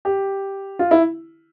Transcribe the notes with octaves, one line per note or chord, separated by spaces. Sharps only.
G4
F4
E4